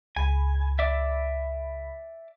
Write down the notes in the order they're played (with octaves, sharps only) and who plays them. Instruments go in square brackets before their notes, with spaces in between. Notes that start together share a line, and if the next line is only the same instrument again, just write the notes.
[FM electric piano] C#2 B5 [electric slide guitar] G#5
[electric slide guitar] D5 E5